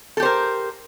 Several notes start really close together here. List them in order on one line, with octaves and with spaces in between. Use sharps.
A4 G4 C5 A#4